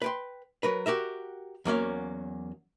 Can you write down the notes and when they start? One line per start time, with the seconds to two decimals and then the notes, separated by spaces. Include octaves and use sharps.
0.02 B4 G5 C6
0.63 F#3 A#4 B4
0.86 F#4 G4 A#4 E5
1.65 E2 F#3 A#3 C#4